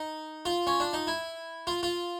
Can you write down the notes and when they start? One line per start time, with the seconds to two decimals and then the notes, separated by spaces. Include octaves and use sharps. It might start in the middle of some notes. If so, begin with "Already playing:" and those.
Already playing: D#4
0.45 F4
0.67 C#4
0.80 D4
0.93 D#4
1.07 E4
1.67 F4
1.83 F4